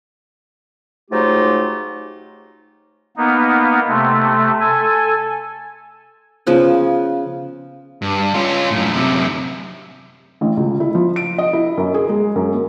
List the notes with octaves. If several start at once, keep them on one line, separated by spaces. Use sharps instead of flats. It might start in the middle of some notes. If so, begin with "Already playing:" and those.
G#2 F#3 A3 D#4 F4 G4
A#3 B3 D#4
C3 A3
A4 G#5
C#3 F3 B3
G2
C#4 F4
F#2 A2
F#2 C3
A1
C#2
E4
F3
D7
D#5
E4
F#2
G#4
G#3
F#2
A#3